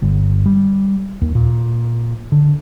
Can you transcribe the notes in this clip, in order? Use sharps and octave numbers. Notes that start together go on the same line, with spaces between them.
G1
G3
D#2
A#2
D3